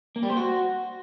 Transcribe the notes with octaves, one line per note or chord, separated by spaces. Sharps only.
A#3
G3
C5
F#4